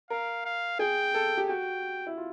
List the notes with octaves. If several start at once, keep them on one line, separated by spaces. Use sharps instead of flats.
A#4 F5
F5
G#4 G5
A4
G4
F#4 G5
E4
F4